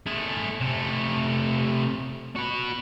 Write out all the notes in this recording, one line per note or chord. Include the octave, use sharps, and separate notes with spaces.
A3 G#4
C3 A3
F#4 B4